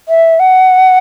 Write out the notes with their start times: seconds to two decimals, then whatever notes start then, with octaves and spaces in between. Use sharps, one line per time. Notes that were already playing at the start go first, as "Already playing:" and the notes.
0.08 E5
0.39 F#5